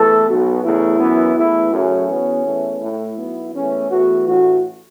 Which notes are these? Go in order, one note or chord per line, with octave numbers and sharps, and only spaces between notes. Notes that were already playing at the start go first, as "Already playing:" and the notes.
Already playing: E2 E3 A3 A4
B1 B2 B3 F#4
E2 C#3 A3 E4
F#2 E3 B3
E2 E3 A3 E4
F#2 C#3 F#3 A3 C#4
E2 B2 B3
E2 E3 A3
A2 A3 E4
B1 B2 B3
E2 E3 A3 C#4
E2 E3 A3 F#4
A1 A2 E3 F#4